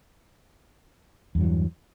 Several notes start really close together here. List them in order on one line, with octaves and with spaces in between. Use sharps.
E2 G2 F#3 E3